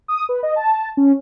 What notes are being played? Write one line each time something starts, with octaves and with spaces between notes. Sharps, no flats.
D#6
B4
D#5
A5
C#4